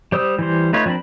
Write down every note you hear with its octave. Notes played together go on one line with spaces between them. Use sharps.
G3 C5 D#6 E6
E3 G3 C5
A3 D#4 F4 B4 C#5
F3 C4 D4 A#4 B5